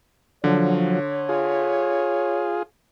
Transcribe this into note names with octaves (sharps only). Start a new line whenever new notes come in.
D3 F3 F#3 C#5
F4 G#4